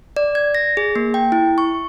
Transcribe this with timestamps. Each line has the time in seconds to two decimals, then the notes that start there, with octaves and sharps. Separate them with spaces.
0.17 D5
0.35 G#6
0.55 A#6
0.77 G#4
0.96 A#3
1.14 G5
1.32 E4
1.58 C#6